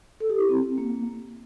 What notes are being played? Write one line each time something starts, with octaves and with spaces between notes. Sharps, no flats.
A4
G4
E4
C4
A#3